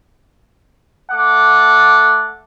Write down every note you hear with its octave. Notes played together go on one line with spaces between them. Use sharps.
A3 F#5 D6